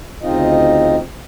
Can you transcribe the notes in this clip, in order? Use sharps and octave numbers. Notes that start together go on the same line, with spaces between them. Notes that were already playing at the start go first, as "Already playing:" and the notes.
D2 C#3 C4 D#4 F4 D#5